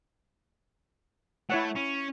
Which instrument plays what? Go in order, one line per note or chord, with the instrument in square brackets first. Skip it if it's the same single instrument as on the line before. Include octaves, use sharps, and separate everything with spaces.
[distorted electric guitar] A3 [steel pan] E4 C#5 F#5
[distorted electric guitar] C#4